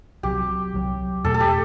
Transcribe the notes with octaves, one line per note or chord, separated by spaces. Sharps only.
C2 C3 F#3 G4
C2 C3 F#3
E2 B2 A3 A4
A4
G4